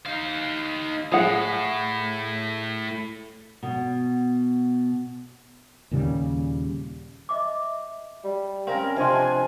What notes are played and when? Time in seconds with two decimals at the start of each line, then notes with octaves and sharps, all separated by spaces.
0.06 D#4 F5
1.12 A2 G#4 F#5
3.63 B2
5.91 D#2 A#2 C#3 G3
7.29 D#5 E5 D6
8.24 G3
8.67 C4 C#4 A#4 F5
8.97 C3 F3 D4 D#5 F5 G5 G#5 C6